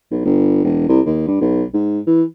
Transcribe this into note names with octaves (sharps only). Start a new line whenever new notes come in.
B1
G1
E1
C2
D#2
G2
B1
G#2
E3